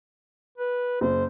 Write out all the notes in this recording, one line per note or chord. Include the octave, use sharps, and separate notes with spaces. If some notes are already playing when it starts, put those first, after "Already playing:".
B4
F#1 C5